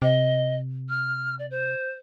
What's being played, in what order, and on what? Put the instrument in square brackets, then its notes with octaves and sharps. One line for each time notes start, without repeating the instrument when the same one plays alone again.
[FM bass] C3 [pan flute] D#5
[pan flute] F6
D5
C5